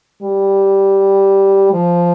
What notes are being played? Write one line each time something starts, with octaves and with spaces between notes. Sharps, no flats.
G3
F3